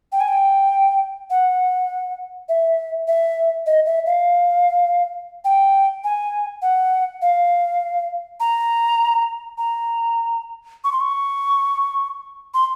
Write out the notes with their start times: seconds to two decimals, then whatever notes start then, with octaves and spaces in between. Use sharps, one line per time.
0.12 G5
0.20 G#5
0.28 G5
1.30 F#5
2.49 E5
3.08 E5
3.66 D#5
3.86 E5
4.06 F5
5.45 G5
6.04 G#5
6.62 F#5
7.22 F5
8.40 A#5
9.58 A#5
10.84 C#6
10.92 C6
11.00 C#6
12.54 C6